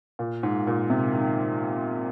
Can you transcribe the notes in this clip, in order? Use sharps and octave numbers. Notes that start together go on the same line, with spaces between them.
A#2
G#2
A#2
C3
D#3